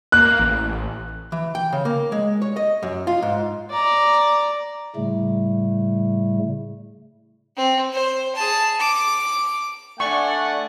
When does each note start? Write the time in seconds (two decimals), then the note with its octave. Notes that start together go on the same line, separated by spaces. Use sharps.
0.12 A#3 F#6
0.39 A1
1.32 E3
1.55 G5
1.72 C#3
1.85 A#3
2.12 G#3
2.42 C#5
2.56 D#5
2.83 F#2
3.07 F4
3.22 G#2
3.71 D5 A#5
4.96 A2 C#3 G3 A3
7.56 C4
7.93 C5
8.35 G#4 A5
8.80 D6
10.00 A3 D4 D5 F#5 G#5 C#6